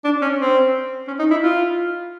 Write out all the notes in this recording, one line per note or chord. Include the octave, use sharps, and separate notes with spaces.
D4
C#4
C4
C#4
D#4
E4
F4